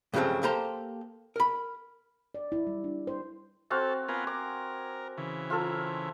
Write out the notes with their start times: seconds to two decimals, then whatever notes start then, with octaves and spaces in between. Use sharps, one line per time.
0.14 G2 C#3 F3 F#3 A3 C4
0.43 A#3 G4 A4 C5 A#5 C6
1.36 A#4 B5
2.35 D5
2.52 E4
2.67 G3
2.84 D4
3.07 C5
3.70 C4 F#4 A4 F5
4.08 B3 F4 A#4 G#5
4.27 A#4 D6
5.17 C#3 E3
5.50 F4 A4 A#5